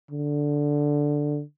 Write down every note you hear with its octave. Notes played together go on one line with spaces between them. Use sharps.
D3